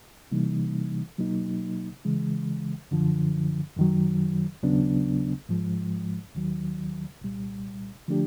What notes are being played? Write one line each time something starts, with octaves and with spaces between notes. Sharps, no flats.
C3 E3 G3 A#3 D#4
B2 F#3 A#3 D#4
C#3 E3 G#3
F#2 D3 F3
F#2 D#3 F#3
D#2 C#3 F#3 B3 D4
G#2 F3 G#3
D#2 D#3 F#3
C2 A#2 G3
D3 F3 A3 D4 G4